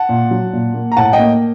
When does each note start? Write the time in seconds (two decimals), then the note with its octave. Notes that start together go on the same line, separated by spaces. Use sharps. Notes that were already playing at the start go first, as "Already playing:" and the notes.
Already playing: F#5 A5
0.09 A#2
0.31 F#3
0.53 A#2
0.74 A#3
0.92 A#5
0.96 A2 F#5 A5
1.13 D#5 G5
1.19 A#3